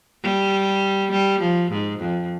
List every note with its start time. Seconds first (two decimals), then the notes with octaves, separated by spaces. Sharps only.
0.23 G3
1.12 G3
1.41 F3
1.71 G#2
2.00 F2